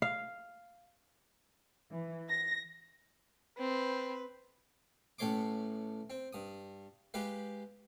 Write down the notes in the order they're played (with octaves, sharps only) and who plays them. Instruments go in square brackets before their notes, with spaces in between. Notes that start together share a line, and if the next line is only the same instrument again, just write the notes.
[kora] F5
[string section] E3
A#6
[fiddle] C4 [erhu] B4
[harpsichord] A1 A2 A3 C#5 C6 D6
C4
G2 D#6
G#3 G4 B4 F5